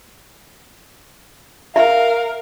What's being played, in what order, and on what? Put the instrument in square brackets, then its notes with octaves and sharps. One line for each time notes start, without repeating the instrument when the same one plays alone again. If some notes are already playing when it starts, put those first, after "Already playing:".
[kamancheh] A#4 [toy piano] E5 [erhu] F5